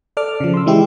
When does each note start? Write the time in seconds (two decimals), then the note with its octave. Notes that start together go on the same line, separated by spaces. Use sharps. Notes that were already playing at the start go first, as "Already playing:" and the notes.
0.17 A4 D5 D6 F6
0.40 C#3 F3
0.54 C6 E6
0.66 E3 G#3 E4 G4